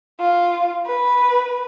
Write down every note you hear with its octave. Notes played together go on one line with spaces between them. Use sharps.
F4
B4